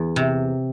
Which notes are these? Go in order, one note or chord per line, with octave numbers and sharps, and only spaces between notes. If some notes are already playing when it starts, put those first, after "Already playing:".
Already playing: E2
C3